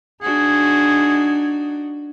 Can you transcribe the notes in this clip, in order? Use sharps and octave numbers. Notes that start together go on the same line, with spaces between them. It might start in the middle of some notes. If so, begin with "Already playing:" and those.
D4 D#4 F#4 G#4